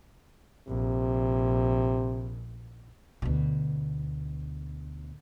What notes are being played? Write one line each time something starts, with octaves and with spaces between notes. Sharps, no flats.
A#1 C3
D2 B2